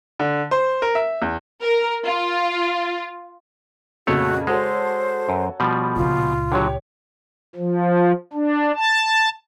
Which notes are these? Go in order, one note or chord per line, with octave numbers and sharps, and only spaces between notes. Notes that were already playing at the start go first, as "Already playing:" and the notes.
D3
C5
A#4
E5
E2
A#4
F4
F2 A#2 C#3 A3 F#4 C#5
G#3 F#4 A4 C5 C#5
F#2
B2 F3 G3
C#2 A#2 F4
D3 F#3 G4 C#5 G5
F3
D4
A5